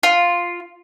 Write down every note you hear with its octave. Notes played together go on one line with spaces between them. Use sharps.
F4